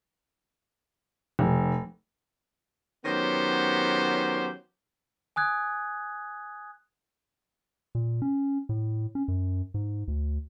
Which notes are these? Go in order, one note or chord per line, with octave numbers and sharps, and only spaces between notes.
F1
D#3 F#3 B3 C#4 G4 C5
G#5 D#6 F#6 G#6
A#2
C#4
A2
C#4
F#2
G#2
D2